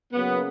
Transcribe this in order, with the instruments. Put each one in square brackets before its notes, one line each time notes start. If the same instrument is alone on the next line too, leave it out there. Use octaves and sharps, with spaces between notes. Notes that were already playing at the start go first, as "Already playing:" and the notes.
[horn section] C#3 F#3 A#3 B3